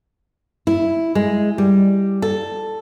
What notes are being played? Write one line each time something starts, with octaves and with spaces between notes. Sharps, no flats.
E4
G#3
G3
A4